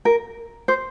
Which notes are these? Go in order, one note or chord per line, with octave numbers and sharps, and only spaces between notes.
A#4
C5